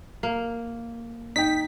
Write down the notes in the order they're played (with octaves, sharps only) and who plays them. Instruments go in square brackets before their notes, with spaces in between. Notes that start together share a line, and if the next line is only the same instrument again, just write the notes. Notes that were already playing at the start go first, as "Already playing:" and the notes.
[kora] A#3
[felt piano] D#4 G5 [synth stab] B6